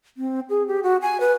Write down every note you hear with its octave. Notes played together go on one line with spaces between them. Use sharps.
C4
G#4
G4
F#4
G#5
B4